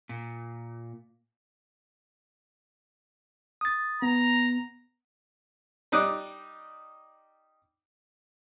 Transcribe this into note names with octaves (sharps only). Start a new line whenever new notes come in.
A#2
D#6 A6
B3 A#5
G3 D#4 D#5 D6 F#6